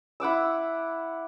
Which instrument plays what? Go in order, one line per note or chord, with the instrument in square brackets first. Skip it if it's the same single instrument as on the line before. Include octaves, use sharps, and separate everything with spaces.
[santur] E4 F#5 D6 E6